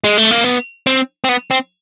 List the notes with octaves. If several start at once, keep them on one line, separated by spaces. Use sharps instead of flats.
G#3
A3
A#3
B3
C4
C4
B3
C4